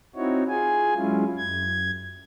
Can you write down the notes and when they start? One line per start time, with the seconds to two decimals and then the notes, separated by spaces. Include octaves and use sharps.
0.16 C4 D#4 E4 F#4 C#5
0.49 F4 G#4 G#5
0.95 F#3 G#3 C#4 E4 F4
1.37 F#2 G#6